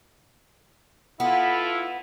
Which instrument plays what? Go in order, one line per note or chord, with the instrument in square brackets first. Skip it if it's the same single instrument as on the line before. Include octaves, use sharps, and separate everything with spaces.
[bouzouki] B3 [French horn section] E4 F4 A4